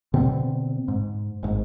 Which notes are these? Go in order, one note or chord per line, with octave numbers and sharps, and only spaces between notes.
B2 D3 C4
G#2
G#1 G#2